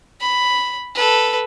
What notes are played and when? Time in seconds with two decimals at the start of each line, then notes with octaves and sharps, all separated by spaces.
0.20 B5
0.95 A4 B4